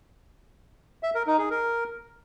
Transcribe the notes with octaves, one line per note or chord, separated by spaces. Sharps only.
E5
A#4
D#4
G#4
A#4